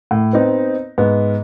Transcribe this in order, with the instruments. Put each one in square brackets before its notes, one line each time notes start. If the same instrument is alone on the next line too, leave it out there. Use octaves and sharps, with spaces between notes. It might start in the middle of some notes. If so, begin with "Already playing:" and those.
[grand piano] A2
B3 C4 D#4
G#2 B3